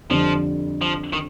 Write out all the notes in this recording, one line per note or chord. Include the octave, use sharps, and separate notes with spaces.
F2 D3 F3 G3
F3
D#3